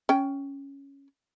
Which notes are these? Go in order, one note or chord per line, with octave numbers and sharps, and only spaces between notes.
C#4 G5